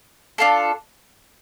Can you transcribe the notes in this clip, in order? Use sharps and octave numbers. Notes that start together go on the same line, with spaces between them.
D4 F4 A4